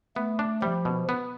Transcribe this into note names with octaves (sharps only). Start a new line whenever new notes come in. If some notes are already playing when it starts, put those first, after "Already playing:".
A3 B3
D4
F3 G3
B2
B3